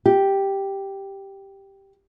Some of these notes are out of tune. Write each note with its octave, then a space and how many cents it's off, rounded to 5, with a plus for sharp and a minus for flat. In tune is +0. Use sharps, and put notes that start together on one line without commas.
G4 +0